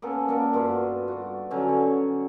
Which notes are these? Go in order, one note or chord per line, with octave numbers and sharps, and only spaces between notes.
A#3 B3 C#4 A4
A#3 D4 A4 A#4
G2 B3 F4 F#4
F#4 D5
D3 F#3 C#4
C#5